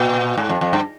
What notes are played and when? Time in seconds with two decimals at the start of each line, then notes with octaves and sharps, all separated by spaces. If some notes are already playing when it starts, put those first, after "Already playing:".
Already playing: A#2
0.38 G#2
0.49 F2
0.61 F2
0.73 G2